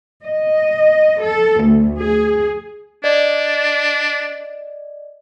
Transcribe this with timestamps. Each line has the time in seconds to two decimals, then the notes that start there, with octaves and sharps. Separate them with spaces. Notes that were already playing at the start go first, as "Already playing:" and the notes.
0.24 D#5
1.22 A4
1.63 D2
1.98 G#4
3.04 D4 D5 D#5